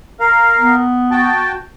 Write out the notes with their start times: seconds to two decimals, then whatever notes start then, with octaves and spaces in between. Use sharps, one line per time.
0.20 A#4 F5
0.58 B3
1.11 F#4 G5 A5